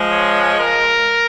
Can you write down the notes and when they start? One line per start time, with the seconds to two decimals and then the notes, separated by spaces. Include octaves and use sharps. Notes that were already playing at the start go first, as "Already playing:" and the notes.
Already playing: F3 G#3
0.11 C#5
0.59 A#4